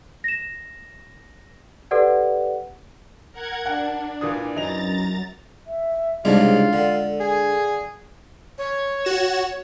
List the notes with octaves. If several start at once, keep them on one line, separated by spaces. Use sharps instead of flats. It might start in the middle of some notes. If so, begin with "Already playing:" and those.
A#6 E7
G4 A4 B4 D5 F#5
A#4 F#5 G#6
D4 F#5
A#2 E3 D#6
F#2 E3 D#4 A#5 A6 F7
E5
C2 G#2 C#3 G#3 D4 F4 G#4
D3 A4
G#4
C#5
F#4 E7